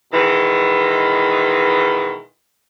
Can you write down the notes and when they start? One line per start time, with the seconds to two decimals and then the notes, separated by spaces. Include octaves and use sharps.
0.12 B2 D#3 E3 G#3